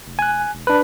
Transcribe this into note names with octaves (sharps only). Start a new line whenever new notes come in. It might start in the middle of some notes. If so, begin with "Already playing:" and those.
F1
G#5 F#6
E1
D4 B4